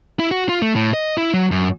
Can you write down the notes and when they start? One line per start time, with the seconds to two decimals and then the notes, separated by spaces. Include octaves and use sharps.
0.19 E4
0.31 F#4
0.49 F4
0.62 A3
0.76 A2
0.94 D#5
1.18 E4
1.34 F#3
1.52 F#2